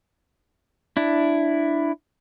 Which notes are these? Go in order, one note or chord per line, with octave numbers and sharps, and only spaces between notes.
D4 E4